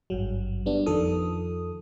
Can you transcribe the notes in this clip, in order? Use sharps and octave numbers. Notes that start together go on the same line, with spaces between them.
G#1 G2 F#3
G3 B3 D4
F2 D#3 F3 A4 D#6